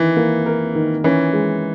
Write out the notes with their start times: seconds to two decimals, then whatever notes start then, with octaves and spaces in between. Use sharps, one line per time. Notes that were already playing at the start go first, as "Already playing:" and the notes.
Already playing: D#3 E3 E4
0.17 A#3
0.46 A#4
0.75 D#3
1.04 E3 C#4
1.33 G#3